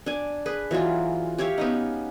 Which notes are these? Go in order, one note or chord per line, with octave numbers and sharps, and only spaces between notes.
D4 G#5
G#4 B4
E3 F#3 G#3 F4
G4 C#5 E5 F5
B3 C#4 D#4